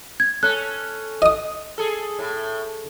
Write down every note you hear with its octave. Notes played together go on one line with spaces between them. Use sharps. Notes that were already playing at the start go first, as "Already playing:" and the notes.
G#6
C#4 A4 F#6
D#5 D#6
G#4 A4
A2